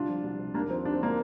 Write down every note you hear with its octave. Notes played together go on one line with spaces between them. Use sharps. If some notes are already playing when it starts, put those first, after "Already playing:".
Already playing: C2 D3 D4 F4
F3
C2
C3
D#2 A#3 D4
F3 C4
D#2 D4
C4
D3 A#3